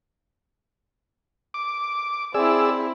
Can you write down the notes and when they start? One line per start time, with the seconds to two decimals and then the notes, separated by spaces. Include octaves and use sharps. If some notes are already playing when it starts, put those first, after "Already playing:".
1.54 D6
2.34 C4 E4 G#4 D5 E6